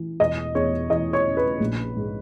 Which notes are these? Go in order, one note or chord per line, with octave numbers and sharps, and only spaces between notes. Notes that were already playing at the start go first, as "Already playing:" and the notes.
Already playing: E3
E1 D#5
E2 C#5
E3 D#5
C#5
C#3
B4
A#1
G#2